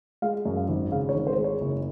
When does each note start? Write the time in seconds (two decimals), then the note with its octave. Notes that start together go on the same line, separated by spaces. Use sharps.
0.22 G#3 F5
0.46 F#2
0.57 F5
0.69 G#1
0.92 C#3 F5
1.09 C#5
1.15 G#1
1.27 C5
1.38 G#3
1.44 C#5
1.61 F#1